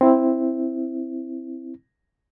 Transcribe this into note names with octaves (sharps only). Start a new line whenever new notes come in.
C4 E4